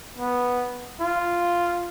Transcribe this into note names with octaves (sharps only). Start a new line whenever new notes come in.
B3
F4